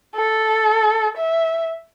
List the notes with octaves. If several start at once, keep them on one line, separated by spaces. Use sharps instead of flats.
A4
E5